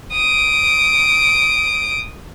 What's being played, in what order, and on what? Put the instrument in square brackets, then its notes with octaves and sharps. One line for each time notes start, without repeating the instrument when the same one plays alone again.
[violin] D#6 D7